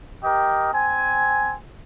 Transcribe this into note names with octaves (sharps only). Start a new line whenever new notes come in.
G4 A#4 D#5
C4 G#5